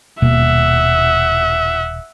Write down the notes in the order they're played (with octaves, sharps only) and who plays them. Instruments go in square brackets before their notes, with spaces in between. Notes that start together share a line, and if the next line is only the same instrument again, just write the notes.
[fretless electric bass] D#1 B2 A#3 [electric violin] E5 F#5